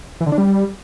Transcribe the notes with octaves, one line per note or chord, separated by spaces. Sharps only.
E3
D3
D4
G3